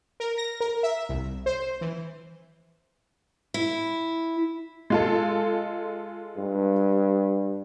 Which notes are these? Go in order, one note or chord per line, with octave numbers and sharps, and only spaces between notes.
A#4
A#6
A#4
E5
C2
C5
E3
E4
G#3 F4 A4
G2